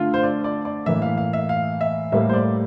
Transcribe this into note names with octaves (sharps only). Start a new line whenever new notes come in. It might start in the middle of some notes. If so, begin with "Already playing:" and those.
Already playing: D3 A3 F4
C5
D5
D5
D5
A2 E3 A#3 E5
F5
F5
E5
F5
E5
A2 G3 A#3 E5
C5
D5